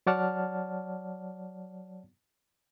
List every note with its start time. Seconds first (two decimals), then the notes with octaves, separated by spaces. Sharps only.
0.06 F#3 C#5 D5 F#5 A5 F6